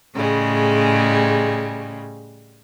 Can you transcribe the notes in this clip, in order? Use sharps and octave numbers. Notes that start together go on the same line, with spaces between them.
A2 C#3 G3 G#3